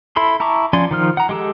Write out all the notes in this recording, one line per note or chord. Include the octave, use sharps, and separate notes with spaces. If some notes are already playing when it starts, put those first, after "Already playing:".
E4 A4 B5 C6
E4 A5 A#5 C#6 D6
F3 C#4 D5 G#5 C6
D#3 F3 F6
F#5 A#5
G#3 G4 A4